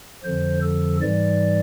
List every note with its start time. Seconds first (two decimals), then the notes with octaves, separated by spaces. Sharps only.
0.24 F2 D3 F3 C5
0.62 A4
1.02 G#2 E3 G3 D5